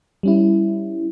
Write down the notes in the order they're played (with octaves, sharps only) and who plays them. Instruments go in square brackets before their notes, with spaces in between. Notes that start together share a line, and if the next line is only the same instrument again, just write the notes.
[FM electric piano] G3 C#4 E4